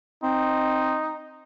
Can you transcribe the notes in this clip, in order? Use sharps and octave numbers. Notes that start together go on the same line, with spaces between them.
C4 D#4